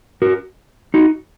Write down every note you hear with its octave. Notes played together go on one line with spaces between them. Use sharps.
F#4 A#4
D#4 F#4